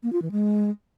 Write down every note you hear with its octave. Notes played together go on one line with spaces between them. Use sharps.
A#3
F4
E3
G#3